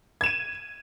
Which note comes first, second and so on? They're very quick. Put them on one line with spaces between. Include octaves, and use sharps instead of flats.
G#6 E7 D#7